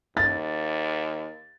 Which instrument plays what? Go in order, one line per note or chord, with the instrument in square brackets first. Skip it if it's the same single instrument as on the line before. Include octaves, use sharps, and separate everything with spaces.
[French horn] D#2 [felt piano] A6